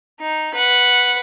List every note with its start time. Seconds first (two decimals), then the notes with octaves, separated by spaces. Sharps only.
0.21 D#4
0.54 B4 F#5